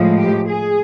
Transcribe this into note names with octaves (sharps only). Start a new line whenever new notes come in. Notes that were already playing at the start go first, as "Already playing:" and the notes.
Already playing: A2 F3 G#3
G4
G#4